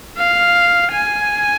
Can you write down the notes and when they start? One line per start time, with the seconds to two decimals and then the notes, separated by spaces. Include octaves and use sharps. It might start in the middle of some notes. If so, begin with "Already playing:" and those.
0.17 F5
0.92 G#5